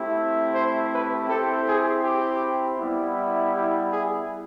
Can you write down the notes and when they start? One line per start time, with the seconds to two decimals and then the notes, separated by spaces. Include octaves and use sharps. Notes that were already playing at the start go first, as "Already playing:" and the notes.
Already playing: A3 C4 E4 G4
0.53 C5
0.91 B4
1.28 C4 E4 G4 A4
1.67 G#4
2.04 G4
2.78 G3 B3 E4
3.54 G4
3.92 G#4